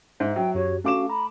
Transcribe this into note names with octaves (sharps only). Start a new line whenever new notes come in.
G#2 E5
F#3 G5
F#2 F#4 G4 C#5
A3 C#4 F#4 F5 D6 E7
A#5 B5